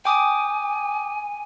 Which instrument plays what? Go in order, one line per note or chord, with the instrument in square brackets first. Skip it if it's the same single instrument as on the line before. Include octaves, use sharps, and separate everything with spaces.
[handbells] G5 D6 D#6 [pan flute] G#5